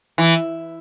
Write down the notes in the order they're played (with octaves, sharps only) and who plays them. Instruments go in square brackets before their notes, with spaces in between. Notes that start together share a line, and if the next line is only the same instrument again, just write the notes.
[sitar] E3